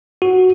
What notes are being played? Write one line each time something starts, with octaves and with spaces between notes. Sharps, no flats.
F#4